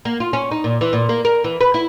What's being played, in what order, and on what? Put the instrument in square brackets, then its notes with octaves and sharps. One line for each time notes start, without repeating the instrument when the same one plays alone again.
[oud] A#3
F4
C#4
D#4
A#2
E3
A#2
A#3
A#4
E3
B4
E4